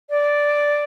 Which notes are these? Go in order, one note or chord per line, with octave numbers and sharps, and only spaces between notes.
D5